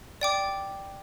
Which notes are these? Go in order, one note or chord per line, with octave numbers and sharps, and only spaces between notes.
D5 G5 D6